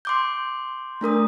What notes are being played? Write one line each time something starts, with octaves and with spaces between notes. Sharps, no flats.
C6 D6 G6
A3 D4 A#4 D#6